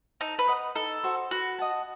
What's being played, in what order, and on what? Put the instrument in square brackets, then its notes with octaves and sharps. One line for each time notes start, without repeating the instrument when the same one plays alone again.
[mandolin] D#4 [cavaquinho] A4
[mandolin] B4
[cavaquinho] D#5 F#5
[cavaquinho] D#4 [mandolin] A4
[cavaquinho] F#4 C5
[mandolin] F#4 [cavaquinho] B4
[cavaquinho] D#5 F#5 A5